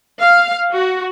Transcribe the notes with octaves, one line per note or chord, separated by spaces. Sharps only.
F5
F#4